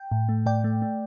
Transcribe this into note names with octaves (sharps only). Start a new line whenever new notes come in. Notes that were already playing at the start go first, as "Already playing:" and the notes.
Already playing: G5
A2
A3
A2 D5 G5
A3
A3